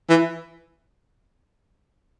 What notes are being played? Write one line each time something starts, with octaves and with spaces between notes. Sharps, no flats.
E3